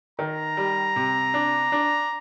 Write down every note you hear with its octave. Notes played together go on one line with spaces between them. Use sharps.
D#3 A#5
G3
C3
D4
D4